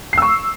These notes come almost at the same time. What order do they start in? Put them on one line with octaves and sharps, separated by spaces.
C7 E6 C#6